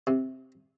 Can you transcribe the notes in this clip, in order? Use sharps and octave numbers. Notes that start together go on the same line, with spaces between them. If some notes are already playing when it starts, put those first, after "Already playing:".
C3